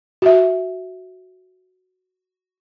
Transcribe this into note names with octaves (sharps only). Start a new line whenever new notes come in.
F#4 E5